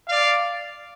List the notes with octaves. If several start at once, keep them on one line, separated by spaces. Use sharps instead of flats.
D5 F5